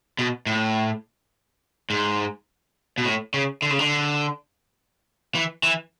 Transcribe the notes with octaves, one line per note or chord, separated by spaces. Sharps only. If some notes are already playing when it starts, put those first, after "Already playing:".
B2
A2
G#2
B2
A2
C#3
D3
C#3
D3
E3
E3